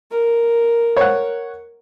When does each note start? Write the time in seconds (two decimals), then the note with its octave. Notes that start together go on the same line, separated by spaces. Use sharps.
0.11 A#4
0.96 C#5 F#5